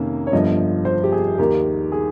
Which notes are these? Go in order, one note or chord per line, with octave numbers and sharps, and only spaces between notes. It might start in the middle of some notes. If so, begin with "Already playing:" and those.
Already playing: F2 C3 D#3 A#3 C#4
C#5
G1 G2 F3 D#5
C5
G4
G#4
D#2 D#3 A#3 D#4 G4
G#4